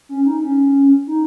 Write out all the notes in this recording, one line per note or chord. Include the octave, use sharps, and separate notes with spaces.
C#4
D#4
C#4
D#4